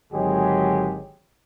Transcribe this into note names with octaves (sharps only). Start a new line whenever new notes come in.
G#1 D3 F#3 G#3 G4 G#4